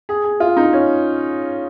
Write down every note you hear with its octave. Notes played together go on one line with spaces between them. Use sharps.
G#4
G#4
F4
D#4
C#4